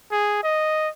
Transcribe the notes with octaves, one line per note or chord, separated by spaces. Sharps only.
G#4
D#5